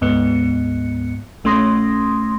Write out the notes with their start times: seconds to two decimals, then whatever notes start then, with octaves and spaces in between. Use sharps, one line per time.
0.01 D2 G#2 B3 C#7
1.44 A#1 A3 C#4 C6 D#6 A#6